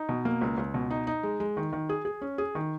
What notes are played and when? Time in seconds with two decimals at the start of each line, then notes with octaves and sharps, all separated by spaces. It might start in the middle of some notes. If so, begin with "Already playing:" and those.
Already playing: D#4
0.09 B2
0.25 A#3
0.41 C#2
0.57 C#2
0.74 B2
0.91 D#4
1.07 D#4
1.23 G#3
1.40 G#3
1.57 D#3
1.73 D#3
1.89 G#4
2.05 G#4
2.21 C#4
2.38 G#4
2.55 D#3